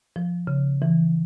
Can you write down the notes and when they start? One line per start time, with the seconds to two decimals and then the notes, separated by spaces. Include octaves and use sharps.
0.16 F3
0.47 C#3
0.82 E3